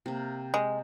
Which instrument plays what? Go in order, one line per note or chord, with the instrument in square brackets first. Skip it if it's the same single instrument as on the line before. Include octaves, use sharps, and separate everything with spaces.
[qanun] C3 A#3
[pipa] G#3